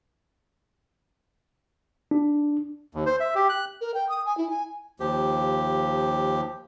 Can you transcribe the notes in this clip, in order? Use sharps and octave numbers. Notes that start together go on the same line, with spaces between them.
D4
D#2
C5
E5
G4
F#6
A#4
G5
D#6
G#5
E4
G#5
D#2 F3 G4